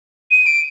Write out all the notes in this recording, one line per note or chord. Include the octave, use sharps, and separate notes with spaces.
D#7
D7